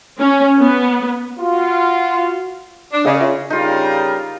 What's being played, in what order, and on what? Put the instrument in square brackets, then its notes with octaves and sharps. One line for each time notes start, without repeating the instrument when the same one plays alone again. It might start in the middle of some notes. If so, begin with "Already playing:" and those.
[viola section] C#4
B3
[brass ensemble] F4 F#4
[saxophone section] D4
[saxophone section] C#3 [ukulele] G#4 D5 D#5
[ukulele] F4 D#5 E5
[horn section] C#3 G3 A#4 [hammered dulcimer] D#4 F4